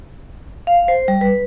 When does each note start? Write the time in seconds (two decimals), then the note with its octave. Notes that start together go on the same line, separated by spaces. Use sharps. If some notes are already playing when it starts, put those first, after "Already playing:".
0.67 F5
0.88 C5
1.08 G3
1.21 B4